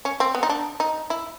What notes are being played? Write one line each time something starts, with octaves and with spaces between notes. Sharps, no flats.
C#4
C4
B3
D#4
D4
D#4
E4